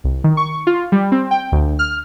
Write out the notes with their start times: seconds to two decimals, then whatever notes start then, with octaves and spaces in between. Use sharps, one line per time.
0.04 C2
0.24 D#3
0.37 C#6
0.67 F4
0.92 G3
1.12 C4
1.31 G5
1.52 D2
1.79 F6